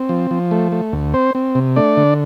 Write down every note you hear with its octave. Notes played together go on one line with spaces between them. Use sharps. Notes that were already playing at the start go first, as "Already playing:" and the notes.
Already playing: C4
F3
F3
A3
A3
D2
C4 C5
C4
C3
A3 D4 D5
D3